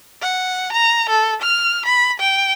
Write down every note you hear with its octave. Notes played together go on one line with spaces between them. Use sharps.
F#5
A#5
A4
F6
B5
G5